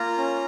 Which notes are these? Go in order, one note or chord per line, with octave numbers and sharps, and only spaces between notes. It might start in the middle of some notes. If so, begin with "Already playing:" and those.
Already playing: A#3 F4 A#5
C#4